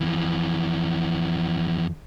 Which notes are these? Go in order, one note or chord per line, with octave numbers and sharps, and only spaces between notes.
F2 E3